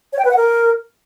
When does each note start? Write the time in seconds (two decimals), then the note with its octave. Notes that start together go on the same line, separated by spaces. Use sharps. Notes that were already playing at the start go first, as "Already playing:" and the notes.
0.13 C#5
0.19 G5
0.25 B4
0.31 F#5
0.37 A#4